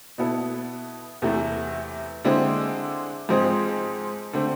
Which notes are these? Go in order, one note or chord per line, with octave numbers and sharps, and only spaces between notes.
B2 B3 E4 A4
E2 C3 E3 A3
D3 G#3 C4 E4
G#2 F3 G#3 C4 G#4
D3 A3 C4